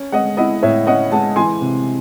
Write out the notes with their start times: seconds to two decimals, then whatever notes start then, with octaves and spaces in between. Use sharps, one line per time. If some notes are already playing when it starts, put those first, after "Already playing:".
Already playing: C#4
0.12 G#3 D#5 F#5
0.37 E4 D#5 F#5
0.63 A2 C#5 E5
0.87 C#4 D#5 F#5
1.12 G#3 F#5 A5
1.36 E3 G#5 C6
1.61 C3